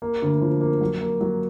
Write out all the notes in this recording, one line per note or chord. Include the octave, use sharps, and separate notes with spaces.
A#3
D2
F3
A#3
F#3
A#3
F#3